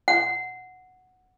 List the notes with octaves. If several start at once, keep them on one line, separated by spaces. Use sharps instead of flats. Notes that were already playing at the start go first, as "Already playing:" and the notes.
F#5